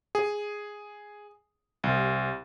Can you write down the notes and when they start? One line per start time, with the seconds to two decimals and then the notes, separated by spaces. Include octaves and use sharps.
0.15 G#4
1.84 C2